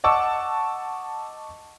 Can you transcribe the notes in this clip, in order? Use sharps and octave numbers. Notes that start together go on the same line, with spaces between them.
D#5 F#5 A5 C#6 D6 E6